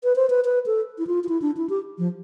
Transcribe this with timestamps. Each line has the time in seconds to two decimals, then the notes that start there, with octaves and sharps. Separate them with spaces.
0.04 B4
0.16 C5
0.30 B4
0.45 B4
0.66 A4
0.98 E4
1.07 F4
1.24 F4
1.29 E4
1.42 D4
1.57 E4
1.70 G4
1.98 F3